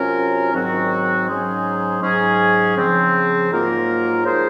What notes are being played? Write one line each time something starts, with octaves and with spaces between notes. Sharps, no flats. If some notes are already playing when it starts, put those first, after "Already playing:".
Already playing: C3 F#3 C#4 F4 A#4
G#2 D#3 F#3 C4 F#4
G#2 F#3 C#4 G#4 C5
G#2 F#3 C#4 G#4
C#3 F3 C4
G#2 F#3 A#3 F4 A#4
F3 A#3 D#4 G#4 C5